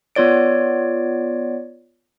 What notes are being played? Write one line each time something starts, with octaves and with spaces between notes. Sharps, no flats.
B3 F4 C#5 D5 D7